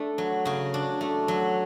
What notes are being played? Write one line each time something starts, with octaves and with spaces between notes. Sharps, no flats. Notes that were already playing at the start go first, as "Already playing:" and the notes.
Already playing: A3 D4
F#3
C#3 F#4
D4
A3
F#3